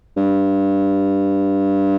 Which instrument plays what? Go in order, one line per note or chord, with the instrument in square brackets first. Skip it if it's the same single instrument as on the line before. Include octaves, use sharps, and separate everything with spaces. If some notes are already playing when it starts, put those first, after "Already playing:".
[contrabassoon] G2